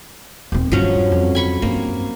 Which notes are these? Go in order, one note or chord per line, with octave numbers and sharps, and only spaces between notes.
D#1 C4
G2 F3 F#3 C#4
F2
G#5 B5 C#6
G2 A#3 C4